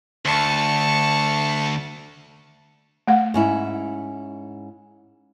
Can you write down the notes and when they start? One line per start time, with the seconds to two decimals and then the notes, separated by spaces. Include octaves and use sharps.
0.25 D2 A5 C#6
3.07 A3 F#5
3.34 G#2 C#4 E4